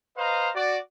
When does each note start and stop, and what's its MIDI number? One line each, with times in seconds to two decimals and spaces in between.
0.17 0.50 71
0.17 0.50 72
0.17 0.50 75
0.17 0.50 77
0.17 0.50 82
0.55 0.77 66
0.55 0.77 74